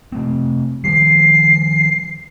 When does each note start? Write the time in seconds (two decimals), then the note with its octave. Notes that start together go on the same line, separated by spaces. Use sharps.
0.12 C3 A3 C4
0.84 D#3 F3 G3 C7